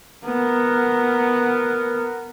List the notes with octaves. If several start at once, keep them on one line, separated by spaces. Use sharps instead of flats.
B3 A#4